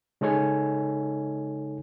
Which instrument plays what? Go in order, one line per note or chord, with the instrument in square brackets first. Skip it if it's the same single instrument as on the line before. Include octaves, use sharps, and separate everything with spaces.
[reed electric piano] C#3 G#3 D#4 A4 C#5 G#5